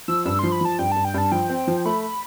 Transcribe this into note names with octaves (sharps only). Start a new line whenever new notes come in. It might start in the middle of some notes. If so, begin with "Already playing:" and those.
F3 E6
G2 E6
F3 C6
B5
F3 A5
G2 G5
G2 A5
G5
G2 A5
F3 G5
C4
F3
A3 B5